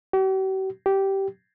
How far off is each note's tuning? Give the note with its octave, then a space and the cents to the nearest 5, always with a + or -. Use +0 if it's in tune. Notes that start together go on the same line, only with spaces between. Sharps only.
G4 -45
G4 -10